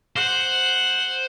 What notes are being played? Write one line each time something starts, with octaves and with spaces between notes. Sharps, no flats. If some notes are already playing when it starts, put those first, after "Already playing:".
C5 F#5